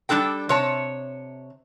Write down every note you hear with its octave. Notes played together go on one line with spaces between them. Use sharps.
G3 G#3 D4 A4 G5
C3 C#5 A5